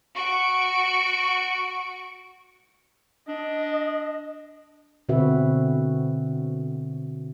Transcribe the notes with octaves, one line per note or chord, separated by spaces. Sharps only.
F#4 C#6 D7
D4 D#5
B2 D3 C4 F#4 B4 E5